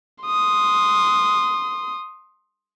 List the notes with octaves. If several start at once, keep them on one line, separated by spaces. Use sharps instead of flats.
C6 D#6